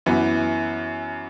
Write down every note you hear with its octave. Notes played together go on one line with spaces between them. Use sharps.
F#2 E3 B3